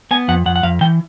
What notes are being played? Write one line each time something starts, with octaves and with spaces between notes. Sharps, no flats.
B3 G#5
F2 F#5
F2 F#5
F#5
F2 F5
E3 G5